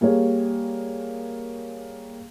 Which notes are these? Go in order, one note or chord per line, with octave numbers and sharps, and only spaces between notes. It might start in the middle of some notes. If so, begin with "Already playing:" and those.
G3 A#3 G#4 C#5